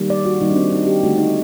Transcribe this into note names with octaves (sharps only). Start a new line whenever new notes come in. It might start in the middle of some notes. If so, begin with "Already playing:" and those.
Already playing: D#3 G3 A#3
D5
F#4
D#3 G3 A#3 D#4
D4
C4
D#4
G4
D3 A3 F#4
D#4